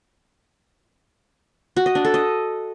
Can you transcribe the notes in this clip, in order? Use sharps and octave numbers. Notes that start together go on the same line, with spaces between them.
F#4
D#5
D4
A4
D#5